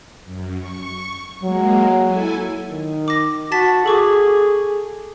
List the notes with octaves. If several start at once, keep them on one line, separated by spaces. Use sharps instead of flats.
F#2
C#6
F#3 G#3 A#3
E4 A4 G#5
D#3
D6 A#6
F#4 A5 A6 B6
G#4 A4 C#6 D6